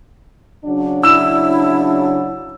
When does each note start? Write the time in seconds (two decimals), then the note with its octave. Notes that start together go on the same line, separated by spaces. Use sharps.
0.65 C#3 F#3 D4
1.03 E4 E6 E7